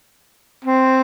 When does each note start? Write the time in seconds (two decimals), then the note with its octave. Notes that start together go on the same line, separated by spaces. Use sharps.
0.65 C4